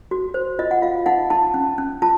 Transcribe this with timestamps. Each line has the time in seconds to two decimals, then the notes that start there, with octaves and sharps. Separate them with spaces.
0.11 F#4
0.34 C5
0.59 F4 D#5
0.71 F#5
0.82 F4 F5
1.06 D#4 F#5
1.30 D#4 A5
1.54 C#4
1.78 C#4
2.02 F4 A5